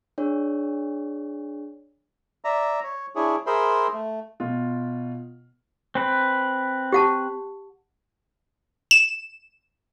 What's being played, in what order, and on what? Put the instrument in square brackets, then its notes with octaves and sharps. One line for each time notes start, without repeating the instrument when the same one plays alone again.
[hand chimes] D4 G#4 C#5
[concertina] D5 E5 A#5
C#5
D4 E4 G#4 C#5
G#4 A#4 C5 E5 B5 C6
A3
[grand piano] B2 F4
[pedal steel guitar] C4 B4
[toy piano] G4 F#5 A5
[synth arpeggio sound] E7